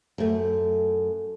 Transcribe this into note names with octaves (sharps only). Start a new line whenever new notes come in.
F#2 A3